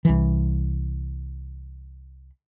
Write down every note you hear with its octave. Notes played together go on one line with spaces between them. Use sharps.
C2 E3